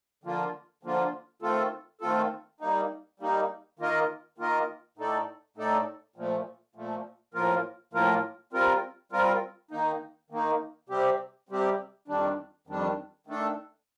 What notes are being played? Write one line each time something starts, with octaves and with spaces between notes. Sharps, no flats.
D3 F3 A#3 F4
D3 F3 A#3 F4
D#3 A3 C4 F4 A4
D#3 A3 C4 F4 A4
G3 A#3 D#4
G3 A#3 D#4
D#3 A#3 F4 A#4 D#5
D#3 A#3 F4 A#4 D#5
A2 A3 D#4 A4 D5
A2 A3 D#4 A4 D5
A#2 F3 A3
A#2 F3 A3
A2 F3 A#3 F4 A#4
A2 F3 A#3 F4 A#4
G3 C4 F4 A#4
G3 C4 F4 A#4
D#3 A#3 D#4
D#3 A#3 D#4
C3 G3 C4 G4
C3 G3 C4 G4
F2 D#3 G3 D4
F2 D#3 G3 D4
D#3 A3 D4 A4